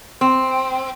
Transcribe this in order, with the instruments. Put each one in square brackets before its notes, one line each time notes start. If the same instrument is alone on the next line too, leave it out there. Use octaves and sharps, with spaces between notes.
[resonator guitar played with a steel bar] C4